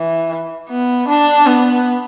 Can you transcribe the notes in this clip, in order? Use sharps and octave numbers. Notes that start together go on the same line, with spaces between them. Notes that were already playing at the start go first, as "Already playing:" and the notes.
Already playing: E3
B3
D4
B3